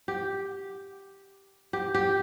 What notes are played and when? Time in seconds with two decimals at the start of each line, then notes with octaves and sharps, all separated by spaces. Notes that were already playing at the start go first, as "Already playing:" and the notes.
0.08 G4
1.73 G4
1.94 G4